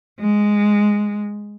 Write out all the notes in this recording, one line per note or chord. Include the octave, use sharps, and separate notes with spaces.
G#3